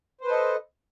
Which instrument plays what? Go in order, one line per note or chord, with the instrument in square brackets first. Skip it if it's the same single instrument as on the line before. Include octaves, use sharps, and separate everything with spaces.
[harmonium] C5
B4
A4
D#5